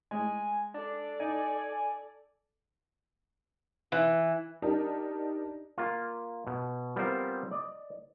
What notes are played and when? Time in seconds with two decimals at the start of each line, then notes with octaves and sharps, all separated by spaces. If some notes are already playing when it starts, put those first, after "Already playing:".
0.11 G#3 G#5
0.74 D4 A4 D5
1.20 D#4 G#5
3.92 E3
4.62 D4 D#4 G4 A#4
5.78 A#3 F4
6.47 B2
6.96 G3 B3 C4 F4 A#4 C5
7.51 D5 D#5